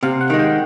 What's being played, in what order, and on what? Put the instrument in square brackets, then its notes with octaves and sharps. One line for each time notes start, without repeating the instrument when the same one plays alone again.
[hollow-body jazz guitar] C3 [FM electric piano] F5
[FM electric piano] F#5
[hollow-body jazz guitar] D#3 G#3
[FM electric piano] G5